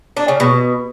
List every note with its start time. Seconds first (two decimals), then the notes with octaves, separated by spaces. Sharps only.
0.17 D4
0.28 C#3
0.40 B2